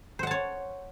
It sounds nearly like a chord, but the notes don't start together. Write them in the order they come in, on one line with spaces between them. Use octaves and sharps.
C5 F#5 A5 C#5